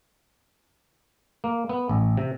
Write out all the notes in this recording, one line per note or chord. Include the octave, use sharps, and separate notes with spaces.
A#3
B3
A1
C3